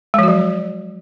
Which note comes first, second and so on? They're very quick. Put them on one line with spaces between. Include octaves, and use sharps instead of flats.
G#3 F3 F#4 F#3